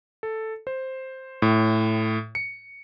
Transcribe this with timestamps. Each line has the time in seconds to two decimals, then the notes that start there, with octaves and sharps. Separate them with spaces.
0.23 A4
0.67 C5
1.42 A2
2.35 C#7